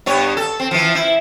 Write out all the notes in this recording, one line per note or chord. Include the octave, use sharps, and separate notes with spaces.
G2 B3 C#5
A4
C4
E3 F3
E4